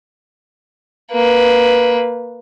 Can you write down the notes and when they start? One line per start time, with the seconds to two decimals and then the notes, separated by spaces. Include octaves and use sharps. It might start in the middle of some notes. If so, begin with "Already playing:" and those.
1.12 A#3 B4